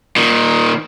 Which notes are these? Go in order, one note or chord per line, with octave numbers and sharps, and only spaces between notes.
A#2 D#3